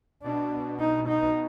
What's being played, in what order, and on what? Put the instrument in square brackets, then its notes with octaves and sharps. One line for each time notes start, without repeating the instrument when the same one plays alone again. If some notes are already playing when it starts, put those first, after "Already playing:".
[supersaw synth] B2 [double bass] D4
[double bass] D#4
D#4